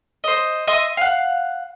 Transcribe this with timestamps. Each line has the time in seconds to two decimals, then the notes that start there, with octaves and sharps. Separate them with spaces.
0.24 C5 D#5
0.67 D#5 E5 C6 D#6
0.97 F5 F#5